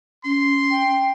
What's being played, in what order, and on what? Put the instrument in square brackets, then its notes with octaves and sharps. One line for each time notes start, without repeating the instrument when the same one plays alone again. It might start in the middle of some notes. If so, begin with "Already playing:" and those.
[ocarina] C#4 [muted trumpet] C6
[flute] G5